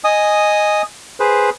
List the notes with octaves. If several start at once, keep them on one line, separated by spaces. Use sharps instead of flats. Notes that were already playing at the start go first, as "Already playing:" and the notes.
D#5 G#5 D#6
G#4 B4 C5